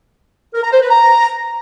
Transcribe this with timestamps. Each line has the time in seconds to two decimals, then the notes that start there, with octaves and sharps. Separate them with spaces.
0.54 A#4
0.64 A#5
0.73 C5
0.82 B4
0.91 A#5